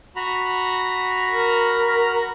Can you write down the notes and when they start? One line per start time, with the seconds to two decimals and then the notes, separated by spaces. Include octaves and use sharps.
0.16 F#4 A#5 B5
1.28 A#4